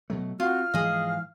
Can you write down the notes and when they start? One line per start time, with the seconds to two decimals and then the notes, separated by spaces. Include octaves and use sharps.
0.10 B2 F#3 A3
0.40 C4 F4 F#4 F6
0.74 G#2 E3 F3 G#4 D#5 F5